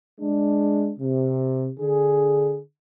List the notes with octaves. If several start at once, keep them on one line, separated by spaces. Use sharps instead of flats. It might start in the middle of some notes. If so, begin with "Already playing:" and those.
G#3 D4
C3
D3 G#4